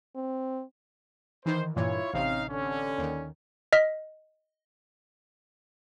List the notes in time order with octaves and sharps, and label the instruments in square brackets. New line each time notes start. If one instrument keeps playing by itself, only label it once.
[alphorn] C4
[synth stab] D#3 E3 [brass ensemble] C5
[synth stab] G2 A#2 E3 [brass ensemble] E4 F4 C#5
[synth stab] A1 C3 [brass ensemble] C#4 D#4 F5
[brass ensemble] D3 C#4
[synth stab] D#2 D#3
[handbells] D#5 F6 B6